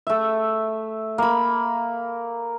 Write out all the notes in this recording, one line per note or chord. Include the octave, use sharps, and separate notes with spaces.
A3 E5
A#3 B5